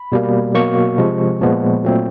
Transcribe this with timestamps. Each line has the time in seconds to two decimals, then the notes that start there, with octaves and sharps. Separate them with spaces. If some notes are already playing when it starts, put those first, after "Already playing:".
Already playing: B5
0.12 B2 G3 A#3
0.54 B2 F#3 A#3 C#6
0.98 C3 F3 G#3
1.41 A#2 F3 G#3 B3
1.84 A#2 F#3 A3 C4